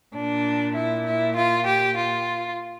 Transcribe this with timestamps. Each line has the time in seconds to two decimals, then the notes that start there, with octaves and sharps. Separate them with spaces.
0.14 A#2 D4
0.75 E4
1.06 E4
1.36 F4
1.66 G4
1.97 F4